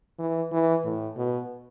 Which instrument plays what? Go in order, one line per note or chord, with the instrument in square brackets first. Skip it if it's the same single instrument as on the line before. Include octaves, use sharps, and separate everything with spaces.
[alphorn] E3
E3
A2
B2